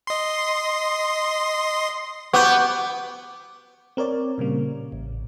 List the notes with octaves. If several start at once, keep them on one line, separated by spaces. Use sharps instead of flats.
D#5 C6
B3 F#4 G4 C#6 D6 G6
C4 A#4 C#5 D5
A#2 C#3 G3 A#3
A1